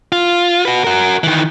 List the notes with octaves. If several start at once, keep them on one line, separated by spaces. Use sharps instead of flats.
F4
F#4 B4
F#4 A#4
D#3 E3